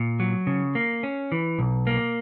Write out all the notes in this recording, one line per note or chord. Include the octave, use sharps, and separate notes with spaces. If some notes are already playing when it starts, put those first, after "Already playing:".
Already playing: A#2
F#3
C#3
A#3
C#4
E3
B1
A#3